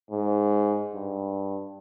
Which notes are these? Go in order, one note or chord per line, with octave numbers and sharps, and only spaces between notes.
G#2
G2